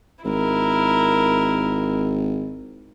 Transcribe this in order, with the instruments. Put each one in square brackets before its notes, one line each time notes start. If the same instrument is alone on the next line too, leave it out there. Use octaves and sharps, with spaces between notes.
[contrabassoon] G#1 [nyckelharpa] E4 A#4